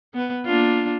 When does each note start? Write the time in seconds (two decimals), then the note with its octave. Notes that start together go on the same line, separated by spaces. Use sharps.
0.14 B3 B4
0.45 A#3 D4 F4